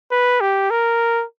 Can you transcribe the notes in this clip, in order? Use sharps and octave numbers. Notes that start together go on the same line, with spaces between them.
B4
G4
A#4